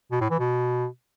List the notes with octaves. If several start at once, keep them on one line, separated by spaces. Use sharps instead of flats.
B2
A2
E3
B2